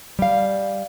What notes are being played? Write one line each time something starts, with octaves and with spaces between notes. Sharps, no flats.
G3 F5